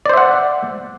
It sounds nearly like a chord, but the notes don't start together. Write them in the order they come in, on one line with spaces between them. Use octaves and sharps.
D5 C5 E5 F#5